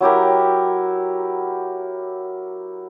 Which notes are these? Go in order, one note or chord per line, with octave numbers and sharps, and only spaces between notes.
F#3 E4 G4 A#4